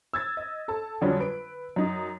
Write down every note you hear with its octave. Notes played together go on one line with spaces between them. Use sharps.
E6 G#6 A6
D#5
A4 A5
F2 D3 F#3 G3 C#4 D4
B4 D7
F#2 D#4